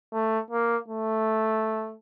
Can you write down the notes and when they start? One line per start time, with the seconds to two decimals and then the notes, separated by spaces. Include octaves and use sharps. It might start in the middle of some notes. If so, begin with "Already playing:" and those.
0.13 A3
0.51 A#3
0.89 A3